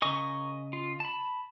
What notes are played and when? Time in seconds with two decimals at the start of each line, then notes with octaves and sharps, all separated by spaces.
0.02 C#3 A#4 D#5 G#5 C#6
0.73 F4
1.00 A5 B5